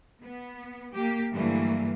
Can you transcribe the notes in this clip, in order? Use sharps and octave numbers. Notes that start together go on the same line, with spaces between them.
B3
A#3 G4
G2 D3 E3 F#3 A3 A#3